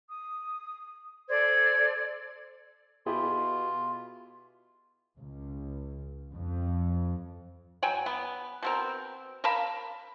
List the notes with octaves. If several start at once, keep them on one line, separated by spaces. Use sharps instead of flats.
D#6
A4 C5 D5 G#6
B2 E4 F4 G4 G#4
C#2
F2
F#3 G5 G#5
B3
B2 C4 A#4
A#4 F5 A5 B5